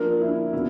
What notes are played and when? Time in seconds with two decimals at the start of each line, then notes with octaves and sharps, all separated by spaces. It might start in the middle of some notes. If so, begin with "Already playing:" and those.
Already playing: F3 A#3 D4 A#4
0.21 E4
0.53 B2 E4